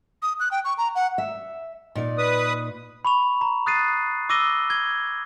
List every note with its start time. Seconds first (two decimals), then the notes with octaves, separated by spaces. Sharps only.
0.22 D#6
0.40 F#6
0.51 G5
0.65 C#6
0.78 A#5
0.95 F#5
1.18 E5
1.95 A#2 D#4 D5
2.18 B4 D#6
3.05 B5 C#6 F7
3.41 A#5
3.66 D#6 F#6 A6 C7 D#7
4.29 D6 E6 A#6 D#7 G7
4.70 G#6 G7